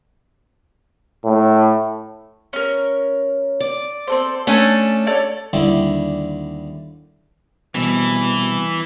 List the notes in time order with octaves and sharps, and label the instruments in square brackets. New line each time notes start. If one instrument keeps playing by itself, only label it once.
[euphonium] A2
[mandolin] C#4 A#4
[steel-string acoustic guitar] D5
[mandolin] C4 A4 C5
[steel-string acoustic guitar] A3 C#4 D4 [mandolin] G#5 A5
[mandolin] A4 C#5 D5
[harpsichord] D#2 D3 G3 D4 E4
[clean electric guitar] C2 B2 [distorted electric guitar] E3